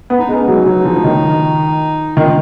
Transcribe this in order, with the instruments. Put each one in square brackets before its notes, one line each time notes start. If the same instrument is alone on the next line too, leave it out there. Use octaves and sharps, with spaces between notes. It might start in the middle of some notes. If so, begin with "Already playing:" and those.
[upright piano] B3
[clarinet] D#4
[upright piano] G#3 [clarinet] C#4
[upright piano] F#3 [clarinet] D#4
[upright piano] F#3
F3
F3
D#3
[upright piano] D#3 [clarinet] F4